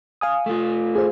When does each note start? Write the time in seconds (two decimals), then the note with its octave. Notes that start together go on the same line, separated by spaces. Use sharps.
0.21 F5 G#5 D#6
0.46 A3 F4
0.95 G#4 C5